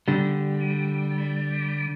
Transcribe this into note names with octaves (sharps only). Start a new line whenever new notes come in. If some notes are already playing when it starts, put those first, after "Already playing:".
D3 G3